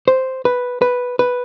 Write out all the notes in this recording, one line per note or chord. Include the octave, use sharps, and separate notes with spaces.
C5
B4
B4
B4